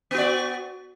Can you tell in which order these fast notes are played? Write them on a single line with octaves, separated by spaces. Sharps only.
B3 F#4 D5